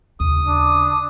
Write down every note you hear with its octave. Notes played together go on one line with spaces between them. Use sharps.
D#2 C#3 D#6
D4